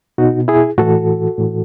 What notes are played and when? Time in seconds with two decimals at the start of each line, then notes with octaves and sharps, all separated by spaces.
0.18 B2 D#4 F#4
0.48 E4 G#4
0.78 A2 E3 F#4 A4
1.38 A2 E3